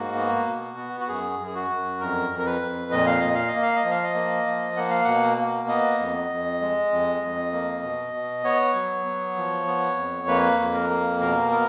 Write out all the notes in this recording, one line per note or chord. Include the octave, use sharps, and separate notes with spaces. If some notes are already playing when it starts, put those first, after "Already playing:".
Already playing: G#2 A#3 F#4
B3
B2
B3
F#4
F#2 G#4
F#2
G#4
F#4
F#2
F2 A#4
F2
A#4
B4
F2
A#2 D#5
F5
A#2 D#5
F5
D#5
A#3
F5
D#5
F3
F5
D#5
A#3
F3
A#3 F#5
F5
B2 F#5
A#3
B3 D#5
F2
F2
G#3
F2
F2
A#3
B2
B2
B3 C#5
F#3
B3
F3
B3
F2
A#3 B4
F2
A#4
A#3
B2 A#4
B3 A#4